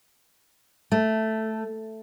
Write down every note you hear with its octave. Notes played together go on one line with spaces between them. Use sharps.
A3